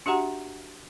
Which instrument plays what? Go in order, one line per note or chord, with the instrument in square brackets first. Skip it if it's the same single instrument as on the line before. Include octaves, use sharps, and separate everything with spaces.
[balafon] D4 F#4 G4 E5 F#5 A#5